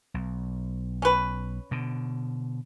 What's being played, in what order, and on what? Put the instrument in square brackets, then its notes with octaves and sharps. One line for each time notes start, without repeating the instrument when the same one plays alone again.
[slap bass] B1
[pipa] C#4 B4
[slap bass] B2 D3